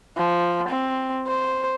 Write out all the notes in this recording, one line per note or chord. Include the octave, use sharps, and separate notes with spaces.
F3
C4
C5